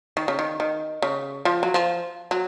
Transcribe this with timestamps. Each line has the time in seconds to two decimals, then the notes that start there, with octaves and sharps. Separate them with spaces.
0.17 D#3
0.28 C#3
0.39 D#3
0.60 D#3
1.02 C#3
1.45 F3
1.63 F#3
1.74 F3
2.31 F#3